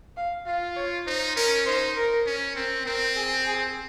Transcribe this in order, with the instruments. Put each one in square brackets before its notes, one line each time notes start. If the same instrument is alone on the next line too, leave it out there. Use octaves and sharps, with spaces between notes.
[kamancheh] F5
[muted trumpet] F4 [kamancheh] F5
[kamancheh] C#5
[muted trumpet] D#4 [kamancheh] C5
[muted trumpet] C#4 [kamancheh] A#4
[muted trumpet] D#4 [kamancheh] C5
[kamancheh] A#4
[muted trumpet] C#4
[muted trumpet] C4 [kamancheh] A#4
[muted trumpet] C4 [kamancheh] A#4
[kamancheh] G#4
G#4